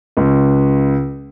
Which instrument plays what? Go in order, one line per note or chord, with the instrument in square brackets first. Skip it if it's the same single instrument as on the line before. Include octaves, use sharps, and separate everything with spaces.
[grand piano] C#2